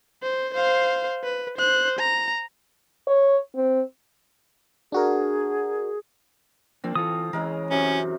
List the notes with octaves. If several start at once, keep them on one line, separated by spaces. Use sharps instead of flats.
C5
C5 F5
B4
C5 F#6
A#5
C#5
C4
D4 F#4 G#4 A#4
F3 A#3 C4 D4
E3 F4 A4 D#6
C#3 E3 G#3 A#4
F#2 C3 C#4